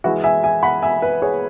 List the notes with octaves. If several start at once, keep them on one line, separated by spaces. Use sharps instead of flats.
E3 G#3 E4 F#4
E5 G#5
E5 G#5
F#5 B5
E5 G#5
B4 E5
G#4 C#5